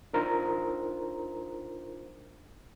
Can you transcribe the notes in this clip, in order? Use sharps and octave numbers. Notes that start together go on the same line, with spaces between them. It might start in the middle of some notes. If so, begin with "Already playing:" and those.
D4 D#4 F4 A#4 C5 A#5